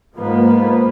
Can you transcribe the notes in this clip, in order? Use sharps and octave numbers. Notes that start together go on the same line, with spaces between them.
G#2 F3 A#3 B3